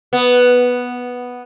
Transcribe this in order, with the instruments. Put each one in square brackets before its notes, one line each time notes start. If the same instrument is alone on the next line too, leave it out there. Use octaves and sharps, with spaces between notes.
[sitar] B3